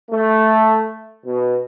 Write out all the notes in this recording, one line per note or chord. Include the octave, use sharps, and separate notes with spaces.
A3
B2